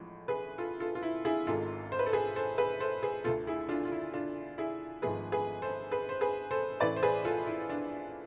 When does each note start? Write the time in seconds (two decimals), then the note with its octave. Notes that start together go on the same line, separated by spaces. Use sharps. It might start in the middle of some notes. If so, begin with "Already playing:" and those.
Already playing: A1 A2 F3 G#3
0.28 G#4 B4
0.58 F4 A4
0.80 F4 A4
0.95 F4
1.02 E4
1.25 E4 G#4
1.47 G#1 G#2 G#3 F4 A4
1.92 C5
1.99 B4
2.06 A4
2.13 G#4 B4
2.36 A4 C5
2.58 G#4 B4
2.80 A4 C5
3.03 G#4 B4
3.24 D2 D3 A3 F4 A4
3.47 E4 G#4
3.69 D4 F4
3.85 F4
3.92 E4
4.13 D4 F4
4.58 E4 G#4
5.02 G#1 G#2 F3 A3 G#4 B4
5.32 G#4 B4
5.62 A4 C5
5.91 G#4 B4
6.09 C5
6.21 G#4 B4
6.51 A4 C5
6.80 A1 A2 E3 A3 B4 D5
6.96 C5
7.03 G#4 B4
7.25 F4 A4
7.46 E4
7.70 D4